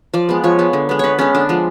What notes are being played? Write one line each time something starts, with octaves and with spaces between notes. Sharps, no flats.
F3 D5
G#3 B3
F3 C#5
G#3 B3
D3
G#3 B3
D3 B4 C#5
G#3 B3 C#4
D3 D4
F3 G#3